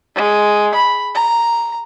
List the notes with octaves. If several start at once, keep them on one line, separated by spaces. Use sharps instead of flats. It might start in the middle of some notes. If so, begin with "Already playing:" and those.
G#3
B5
A#5